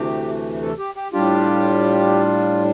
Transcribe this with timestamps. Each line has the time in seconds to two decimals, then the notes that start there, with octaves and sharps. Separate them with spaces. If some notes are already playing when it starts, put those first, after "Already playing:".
Already playing: D2 C3 E3 A3 G4
0.62 A4
0.79 G4
0.96 G4
1.13 A2 G3 D4 F4 G4